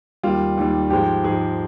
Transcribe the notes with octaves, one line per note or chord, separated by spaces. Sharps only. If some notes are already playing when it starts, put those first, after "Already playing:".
D#2 D#3 G3 F4
D#2 D#3 G3
G#2 F3 G#3 G4
G#2 F3 G#3 G#4